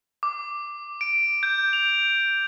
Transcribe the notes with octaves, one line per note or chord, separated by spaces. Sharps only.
D6
D7
G6
F7